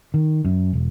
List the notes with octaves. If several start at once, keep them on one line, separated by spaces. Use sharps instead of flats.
D#3
F#2
E1